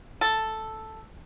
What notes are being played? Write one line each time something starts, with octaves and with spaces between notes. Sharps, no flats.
A4